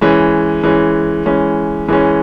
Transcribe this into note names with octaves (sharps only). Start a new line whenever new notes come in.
E3 G#3 C#4
E3 G#3 C#4
E3 G#3 C#4
E3 G#3 C#4